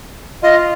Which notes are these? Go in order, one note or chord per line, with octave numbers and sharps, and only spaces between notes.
F4 D#5